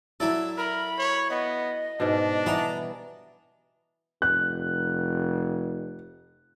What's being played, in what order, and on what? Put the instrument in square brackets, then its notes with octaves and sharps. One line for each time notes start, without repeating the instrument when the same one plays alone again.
[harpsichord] F#3 E4 A4 [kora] D5 [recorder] E6
[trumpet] A#4 [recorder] B5
[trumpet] C#5
[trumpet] B3 [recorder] D#5
[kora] G#2 B2 [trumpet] D4
[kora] E3 G3 B3 [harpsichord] A4 A#5
[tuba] F1 [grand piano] F#6